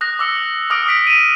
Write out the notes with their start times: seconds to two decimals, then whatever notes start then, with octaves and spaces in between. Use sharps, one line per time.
0.01 D#6 F#6 A#6
0.19 D6 E6 C#7 G7
0.36 F#7
0.70 D6 D#6 F6 A#6 D7
0.86 D6 F6 B6 D7
1.07 D#7 E7